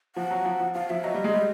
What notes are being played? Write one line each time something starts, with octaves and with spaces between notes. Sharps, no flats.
F3 F#5
F#3
F3
F3
F3 F5
F3 E5
F#3 D#5
G3
G#3
G3